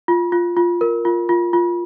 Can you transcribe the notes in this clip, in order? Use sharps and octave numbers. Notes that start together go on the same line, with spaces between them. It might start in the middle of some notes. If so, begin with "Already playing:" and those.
F4
F4
F4
A#4
F4
F4
F4